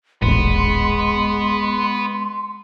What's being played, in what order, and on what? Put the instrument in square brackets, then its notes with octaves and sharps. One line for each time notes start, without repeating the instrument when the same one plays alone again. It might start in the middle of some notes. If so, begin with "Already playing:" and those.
[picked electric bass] D#1 A1 [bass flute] G#3 [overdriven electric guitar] B3 [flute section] C6